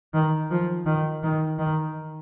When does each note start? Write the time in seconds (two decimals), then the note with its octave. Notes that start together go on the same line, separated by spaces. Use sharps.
0.14 D#3
0.51 F3
0.86 D#3
1.23 D#3
1.58 D#3